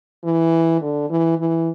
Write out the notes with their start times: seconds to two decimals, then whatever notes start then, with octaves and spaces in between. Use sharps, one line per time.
0.24 E3
0.81 D3
1.10 E3
1.38 E3